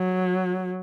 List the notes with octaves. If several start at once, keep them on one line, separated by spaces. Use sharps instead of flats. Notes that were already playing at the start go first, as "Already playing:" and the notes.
Already playing: F#3